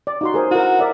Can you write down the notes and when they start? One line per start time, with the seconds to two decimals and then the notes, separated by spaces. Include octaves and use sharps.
0.07 D5
0.21 D#4 F#4 C6
0.34 G#4 A#4 C5
0.51 E4 F#4 A#4
0.79 A#4 D5 E5